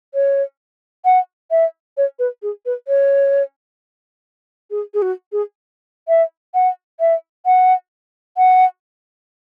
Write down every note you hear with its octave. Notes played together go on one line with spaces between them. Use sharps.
C#5
F#5
E5
C#5
B4
G#4
B4
C#5
G#4
G#4
F#4
G#4
E5
F#5
E5
F#5
F#5